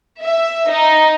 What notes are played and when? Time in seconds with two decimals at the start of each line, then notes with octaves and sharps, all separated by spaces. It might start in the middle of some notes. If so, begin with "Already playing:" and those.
0.22 E5
0.69 D#4